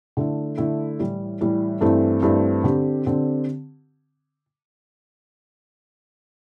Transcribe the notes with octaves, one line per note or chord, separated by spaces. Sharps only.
D3 A3 E4
D3 A3 E4
A2 E3 G3
A2 E3 G3
G2 E3 A3 C4
G2 E3 A3 C4
D3 C4 G4
D3 C4 G4